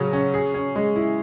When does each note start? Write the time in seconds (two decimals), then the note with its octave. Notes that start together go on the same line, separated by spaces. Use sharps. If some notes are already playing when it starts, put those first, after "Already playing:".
Already playing: C#3 F#3 C#4
0.13 C#4
0.34 G#4
0.54 C#4
0.76 G#3
0.96 E4